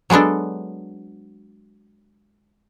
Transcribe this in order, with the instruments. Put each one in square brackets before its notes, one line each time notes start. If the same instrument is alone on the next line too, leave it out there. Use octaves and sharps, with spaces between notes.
[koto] F#3 G#3 B3 D4 A4